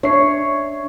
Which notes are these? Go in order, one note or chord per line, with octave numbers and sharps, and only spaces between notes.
D4 C#5 E5 C7